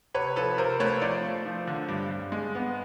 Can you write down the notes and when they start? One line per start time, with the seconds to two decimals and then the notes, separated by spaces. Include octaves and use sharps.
0.14 C3 B4 C#5
0.36 F3 A4 B4
0.58 C3 A#4 C5
0.80 A3 B4 C#5
1.01 F3 C5 D5
1.24 A3
1.46 F3
1.67 D3
1.88 G2
2.11 G2
2.32 G#3
2.55 B3